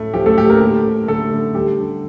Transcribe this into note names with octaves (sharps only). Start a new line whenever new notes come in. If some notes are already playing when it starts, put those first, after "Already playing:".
Already playing: A2 A3
F3 G4
A3 A4
A2 G4
A#3 A#4
D3 G4
D3
D3 A3 A4
D3
G3 G4
D3